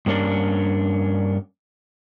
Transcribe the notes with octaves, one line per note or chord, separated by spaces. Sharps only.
G2 A#3 C#4 D4